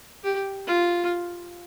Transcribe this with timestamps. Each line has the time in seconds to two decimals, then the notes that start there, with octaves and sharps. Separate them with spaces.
0.24 G4
0.68 F4